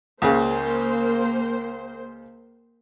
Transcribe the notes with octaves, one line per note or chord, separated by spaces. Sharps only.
C#2 C#3 A#3 G#4 C5